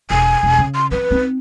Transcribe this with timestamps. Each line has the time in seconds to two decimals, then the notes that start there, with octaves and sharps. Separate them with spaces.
0.10 E1 G#5
0.43 E1
0.58 C#3
0.75 C6
0.91 F3 C4 B4
1.11 C4 D#4